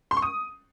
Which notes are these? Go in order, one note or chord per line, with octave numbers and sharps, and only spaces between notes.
C6
C#6
D#6